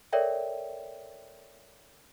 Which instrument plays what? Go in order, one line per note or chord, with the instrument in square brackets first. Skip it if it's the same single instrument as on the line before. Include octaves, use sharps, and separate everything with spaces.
[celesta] A4 A#4 C#5 D5 E5 G5